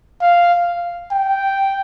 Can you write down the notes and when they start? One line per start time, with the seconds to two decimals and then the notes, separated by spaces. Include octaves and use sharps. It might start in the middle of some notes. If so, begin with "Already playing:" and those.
0.21 F5
1.11 G5